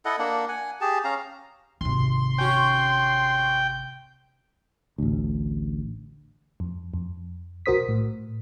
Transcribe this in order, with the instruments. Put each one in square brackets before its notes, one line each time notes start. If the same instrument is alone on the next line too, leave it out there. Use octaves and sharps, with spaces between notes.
[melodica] E4 A4 D#5 F#5
A#3 D4 F#5
F#5 G#5
G4 G#4 A5
C#4 F5 A#5
[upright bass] G#1 C3 [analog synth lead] C6
[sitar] C#4 F#4 [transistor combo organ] G5
[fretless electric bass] A1 D2
[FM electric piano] F2
F2
B1 F#4 A#4 C5 D#6 B6
A2